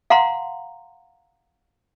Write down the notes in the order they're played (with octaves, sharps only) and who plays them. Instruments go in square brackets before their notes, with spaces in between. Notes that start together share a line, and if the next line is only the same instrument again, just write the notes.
[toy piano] F5 F#5 A#5 C6